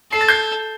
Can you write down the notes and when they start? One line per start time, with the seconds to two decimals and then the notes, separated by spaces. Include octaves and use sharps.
0.12 A4 C7
0.21 A6
0.28 G6 C7